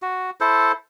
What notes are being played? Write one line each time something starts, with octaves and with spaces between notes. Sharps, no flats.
F#4
E4 A4 C5